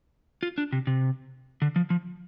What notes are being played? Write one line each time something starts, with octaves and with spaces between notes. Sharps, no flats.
F4
D4
C3
C3
D3
F3
F3